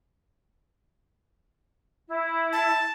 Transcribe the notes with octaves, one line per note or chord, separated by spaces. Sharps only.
E4
A5